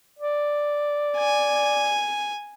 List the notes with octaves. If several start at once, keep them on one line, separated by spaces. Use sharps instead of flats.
D5
G#5